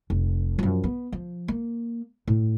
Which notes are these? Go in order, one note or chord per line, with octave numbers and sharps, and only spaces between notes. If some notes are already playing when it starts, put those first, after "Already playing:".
F1
F#2 F3
B3
F3
A#3
A2